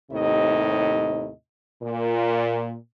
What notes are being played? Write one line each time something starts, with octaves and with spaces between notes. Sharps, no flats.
D#2 A2 C3 D#4 D#5
A#2